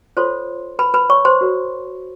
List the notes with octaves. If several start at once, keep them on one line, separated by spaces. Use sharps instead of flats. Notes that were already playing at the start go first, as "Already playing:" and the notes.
F4 A4 C5 C#5 C6
B4 B5
B4 B5
C#5 C#6
C5 C6
F#4 A#4 C#5